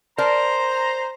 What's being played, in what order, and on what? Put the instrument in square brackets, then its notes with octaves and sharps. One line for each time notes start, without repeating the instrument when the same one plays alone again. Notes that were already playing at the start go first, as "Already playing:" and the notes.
[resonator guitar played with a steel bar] A#4 D5 A5 [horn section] C5 A#5